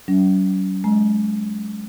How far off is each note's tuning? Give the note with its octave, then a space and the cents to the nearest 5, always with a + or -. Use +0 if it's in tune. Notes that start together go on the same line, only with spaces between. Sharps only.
F#3 +40 C#4 +35
G#3 +30 A#5 +35